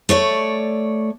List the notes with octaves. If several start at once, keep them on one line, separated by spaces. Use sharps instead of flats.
A3 C#5 D5